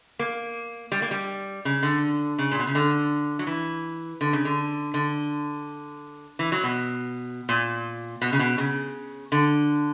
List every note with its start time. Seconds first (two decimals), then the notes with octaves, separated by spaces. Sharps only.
0.19 A#3
0.92 G3
1.02 A#3
1.11 G3
1.65 C#3
1.83 D3
2.39 C#3
2.52 A#2
2.59 B2
2.67 C#3
2.75 D3
3.39 F#3
3.47 E3
4.21 D3
4.33 C#3
4.45 D3
4.94 D3
6.39 E3
6.52 F#3
6.64 B2
7.49 A#2
8.22 B2
8.33 C#3
8.39 B2
8.58 C#3
9.32 D3